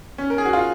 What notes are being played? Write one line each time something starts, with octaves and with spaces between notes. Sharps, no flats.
C#4
A#4
G#4
F#4
F4